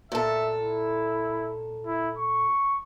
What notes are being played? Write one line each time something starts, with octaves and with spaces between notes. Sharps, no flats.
A#2 A4 E5
E4
E4
C#6